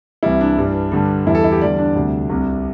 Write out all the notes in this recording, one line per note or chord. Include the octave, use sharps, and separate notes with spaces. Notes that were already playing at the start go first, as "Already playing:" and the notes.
C2 C3 E3 G3 E4
D4
G2 E3 G3
G2 D3 G3
E2 E3 G3 E4
A4
E4
G4
E2 D3 G3 D5
D4
D2 C3 G3
C2 C3 G3